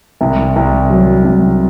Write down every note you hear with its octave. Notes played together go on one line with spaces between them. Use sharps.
C2
C2
F#3
C2